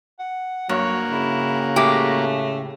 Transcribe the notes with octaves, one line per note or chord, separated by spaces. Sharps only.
F#5
G2 F#3 A#3 F#4 C#5
C#3 E4
A2 G#3 A3 G4